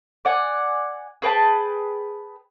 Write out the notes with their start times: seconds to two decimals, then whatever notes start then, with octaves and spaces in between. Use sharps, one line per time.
0.25 D5 F#5 G#5
1.22 G#4 B4 G5 A5